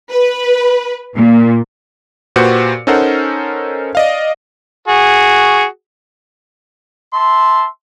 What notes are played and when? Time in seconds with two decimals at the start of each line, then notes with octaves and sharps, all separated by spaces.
0.11 B4
1.15 A#2
2.36 A#2 F#4 G4 B4 C5 C#7
2.87 C#4 D#4 A4 A#4 C5 F#5
3.95 D5 D#5 F5
4.88 F#4 G#4
7.14 E5 A5 C6